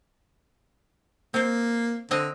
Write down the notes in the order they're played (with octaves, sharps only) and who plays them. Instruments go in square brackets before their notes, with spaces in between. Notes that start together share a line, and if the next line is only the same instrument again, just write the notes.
[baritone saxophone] A#3 [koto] C4 C5
[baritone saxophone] D3 [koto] C4 D#5